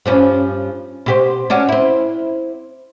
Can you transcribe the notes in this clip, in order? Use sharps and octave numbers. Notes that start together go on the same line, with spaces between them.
G2 F3 C#4
B2 G4 C5
C#4 D4 F#4
C4 E4